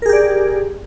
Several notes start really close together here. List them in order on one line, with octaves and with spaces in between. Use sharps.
A#4 G#4 G4 D5